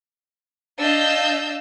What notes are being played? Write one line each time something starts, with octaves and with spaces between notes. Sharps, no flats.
D4 D#5 F5 E6 G6